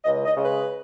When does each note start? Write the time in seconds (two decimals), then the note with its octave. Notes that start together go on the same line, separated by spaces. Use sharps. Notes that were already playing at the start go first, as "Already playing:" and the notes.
0.04 C#2 D#5
0.25 D#5
0.35 C#3 G#3
0.45 B4